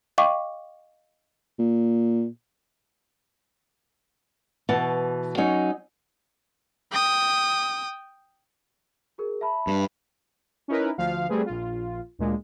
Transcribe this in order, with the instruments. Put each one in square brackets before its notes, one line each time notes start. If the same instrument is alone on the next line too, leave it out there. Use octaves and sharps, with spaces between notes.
[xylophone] D#5 F5 G5 C#6 D6
[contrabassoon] A#2
[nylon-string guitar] B2 E3 F#4 A5
F#3 C#4 D#4
[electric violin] G5 D#6
[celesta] F#4 G#4 A#4
E5 A5 B5
[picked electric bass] G2
[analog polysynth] C#4 D#4 E4 A#4 B4
D2 F3 F5
G3 A3 C4 G#4 B4
A#1 F4
D2 A#2 G#3